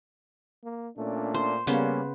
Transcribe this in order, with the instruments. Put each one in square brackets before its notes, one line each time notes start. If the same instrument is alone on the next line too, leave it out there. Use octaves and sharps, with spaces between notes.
[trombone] A#3
[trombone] A#2 [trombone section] A3 C#4 D4
[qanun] C5
[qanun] C#3 B3 C5 [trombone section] G3 A#3 [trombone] C#4